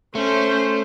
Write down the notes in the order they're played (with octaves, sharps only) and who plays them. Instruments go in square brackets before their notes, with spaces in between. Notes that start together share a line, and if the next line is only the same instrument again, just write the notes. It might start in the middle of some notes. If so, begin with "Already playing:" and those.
[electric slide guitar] A3 [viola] C#4 C5